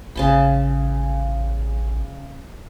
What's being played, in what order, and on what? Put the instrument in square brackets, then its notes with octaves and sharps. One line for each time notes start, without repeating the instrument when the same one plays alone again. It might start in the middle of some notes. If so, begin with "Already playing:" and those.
[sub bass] A1 [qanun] C#3 A5 B5